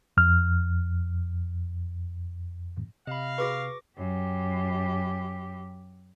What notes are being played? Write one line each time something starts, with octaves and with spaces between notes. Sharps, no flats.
F2 F6
C3 D#5 F5 B5
F#4 G#4 B4 C#6 D6 A#6
F#2 G4